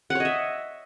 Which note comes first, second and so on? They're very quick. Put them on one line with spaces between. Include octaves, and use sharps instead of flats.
F#5 C#5 D#5 E5